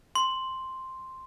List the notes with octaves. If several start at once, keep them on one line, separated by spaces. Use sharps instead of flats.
C6